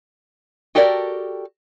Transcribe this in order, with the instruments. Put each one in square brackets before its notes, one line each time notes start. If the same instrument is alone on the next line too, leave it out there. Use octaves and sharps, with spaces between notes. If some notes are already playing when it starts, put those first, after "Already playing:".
[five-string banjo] F#4 G4 A4 A#4 D5